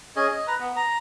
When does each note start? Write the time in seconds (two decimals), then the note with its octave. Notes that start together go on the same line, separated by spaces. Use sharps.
0.16 C#4 G#4 D#5
0.28 D#5
0.47 B4 A#5
0.59 B3
0.76 A#5